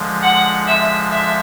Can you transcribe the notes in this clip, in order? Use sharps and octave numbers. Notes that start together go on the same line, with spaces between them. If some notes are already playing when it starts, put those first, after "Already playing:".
Already playing: D3 F3 G#3
F#5
E5
E5